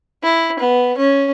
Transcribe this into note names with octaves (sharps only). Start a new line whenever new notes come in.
E4
B3
C#4